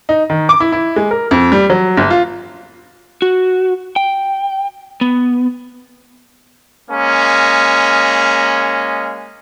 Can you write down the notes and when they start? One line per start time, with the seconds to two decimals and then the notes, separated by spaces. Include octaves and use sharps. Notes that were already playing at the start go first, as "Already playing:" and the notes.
0.09 D#4
0.30 D#3
0.49 D6
0.60 E4
0.72 E4
0.96 G#3
1.11 A#4
1.31 F2
1.52 G3
1.70 F#3
1.97 G1
2.11 F4
3.22 F#4
3.96 G5
5.01 B3
6.91 G#3 A#3 C#4